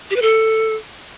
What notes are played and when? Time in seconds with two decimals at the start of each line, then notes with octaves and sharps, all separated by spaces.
0.10 G4
0.16 B4
0.22 A4